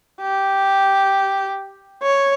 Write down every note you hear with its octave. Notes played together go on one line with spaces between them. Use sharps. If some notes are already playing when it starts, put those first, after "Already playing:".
G4
C#5